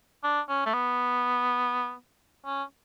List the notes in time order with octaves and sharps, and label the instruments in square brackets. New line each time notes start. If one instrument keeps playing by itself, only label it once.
[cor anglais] D4
C#4
A3
B3
C#4